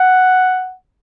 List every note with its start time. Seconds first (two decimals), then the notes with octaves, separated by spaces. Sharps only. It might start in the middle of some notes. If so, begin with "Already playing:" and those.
Already playing: F#5